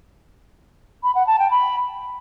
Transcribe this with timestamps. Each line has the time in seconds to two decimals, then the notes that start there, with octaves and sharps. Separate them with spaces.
1.03 B5
1.15 F#5
1.27 A5
1.39 G5
1.51 B5